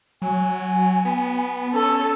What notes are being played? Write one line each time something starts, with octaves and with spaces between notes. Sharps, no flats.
F#3 G#5
B3
C#4 A4